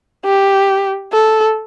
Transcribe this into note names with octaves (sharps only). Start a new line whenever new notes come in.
G4
A4